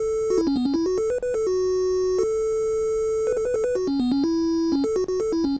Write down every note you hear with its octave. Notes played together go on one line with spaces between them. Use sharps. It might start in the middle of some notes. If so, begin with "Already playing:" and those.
Already playing: A4
F#4
E4
C#4
B3
C#4
E4
F#4
A4
B4
B4
A4
F#4
A4
B4
A4
B4
A4
B4
F#4
C#4
B3
C#4
E4
C#4
A4
F#4
F#4
A4
E4
C#4